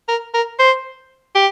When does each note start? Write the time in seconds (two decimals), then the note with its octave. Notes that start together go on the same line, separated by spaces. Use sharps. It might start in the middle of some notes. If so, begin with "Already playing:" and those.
0.08 A#4
0.34 A#4
0.59 C5
1.35 G4